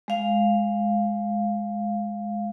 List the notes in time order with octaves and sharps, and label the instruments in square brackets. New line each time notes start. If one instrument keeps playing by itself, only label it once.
[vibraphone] G#3 F5